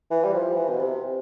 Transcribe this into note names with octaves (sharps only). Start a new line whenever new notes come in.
E3
G3
F3
E3
B2
C3